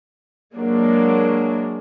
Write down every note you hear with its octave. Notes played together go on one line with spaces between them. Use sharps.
F#3 G#3 A#3 D4